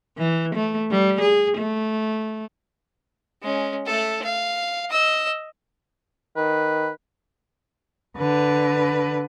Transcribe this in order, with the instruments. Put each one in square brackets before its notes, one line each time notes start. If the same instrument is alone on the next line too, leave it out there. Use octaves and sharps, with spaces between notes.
[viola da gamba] E3
A3
G3
G#4
A3
[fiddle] G#3 C#4
A3 A4
F5
D#5 E6
[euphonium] D#3 [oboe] B4
[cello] D3 B4